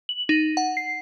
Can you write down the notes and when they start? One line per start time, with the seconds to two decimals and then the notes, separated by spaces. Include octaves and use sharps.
0.09 F#7
0.29 D#4
0.57 F#5
0.77 C7